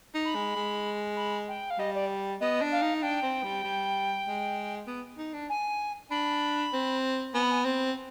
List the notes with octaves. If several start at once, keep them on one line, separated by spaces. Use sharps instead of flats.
D#4
B5
G#3
G#3
B5
G5
F5
G3 D#5
D5
B3 D#5
D4
F5
D#4
D4 G5
C4
G3
G3
G#3
B3
D#4
D4
G#5
D4 B5
C4
B3 G#5
B5
G#5
C4